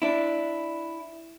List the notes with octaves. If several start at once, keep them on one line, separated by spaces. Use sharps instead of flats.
D4 E4